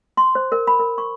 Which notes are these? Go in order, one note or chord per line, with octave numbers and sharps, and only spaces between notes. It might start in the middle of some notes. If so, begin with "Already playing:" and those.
C6
C5
A#4
B5
A#4
C#6